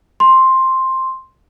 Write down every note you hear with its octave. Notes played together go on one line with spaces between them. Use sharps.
C6